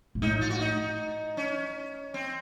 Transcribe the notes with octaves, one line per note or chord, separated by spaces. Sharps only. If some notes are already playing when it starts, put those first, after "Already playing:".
A#2
A2 D#4
F4
F#4
D#4
C#4
C4